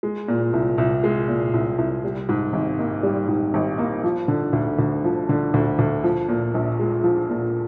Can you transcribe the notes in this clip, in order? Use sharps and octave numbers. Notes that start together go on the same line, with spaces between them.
G#3
A#2
C2
C2
G#3
A#2
C2
C2
G3
G#2
G#1
A#3
G3
G#2
G#1
A#3
F3
D3
D2
D2
F3
D3
D2
D2
F3
A#2
A#1
G#3
F3
A#2